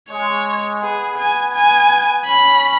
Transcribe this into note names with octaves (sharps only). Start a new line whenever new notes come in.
G#3 C#5
B3 G#4
G#5
G#5
C#4 B5